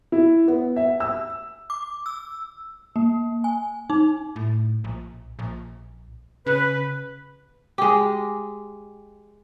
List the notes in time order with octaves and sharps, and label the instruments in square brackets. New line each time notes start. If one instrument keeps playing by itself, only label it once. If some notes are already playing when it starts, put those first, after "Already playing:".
[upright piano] E4
B3
E5
E6
[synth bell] D6
E6
A#3
G#5
D#4
[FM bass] A2
A#1
A#1
[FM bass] C#3 [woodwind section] B4
[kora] G#3 G4